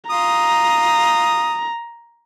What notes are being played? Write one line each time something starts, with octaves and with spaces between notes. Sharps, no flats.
F4 A#5 D#6